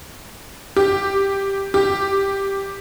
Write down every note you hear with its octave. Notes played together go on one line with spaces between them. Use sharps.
G4
G4